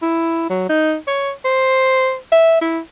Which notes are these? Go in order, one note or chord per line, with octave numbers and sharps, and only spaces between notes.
E4
F#3
D#4
C#5
C5
E5
E4